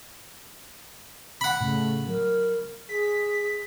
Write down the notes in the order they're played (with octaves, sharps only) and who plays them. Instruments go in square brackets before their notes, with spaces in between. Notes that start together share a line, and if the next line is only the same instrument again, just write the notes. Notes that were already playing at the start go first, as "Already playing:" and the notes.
[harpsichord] F#5 B5
[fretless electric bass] A2 C#3 [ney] A3
[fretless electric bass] F#3 [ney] A#4
[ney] G#4 [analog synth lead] B6